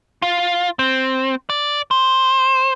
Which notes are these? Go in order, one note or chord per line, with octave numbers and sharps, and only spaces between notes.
F4
C4
D5
C5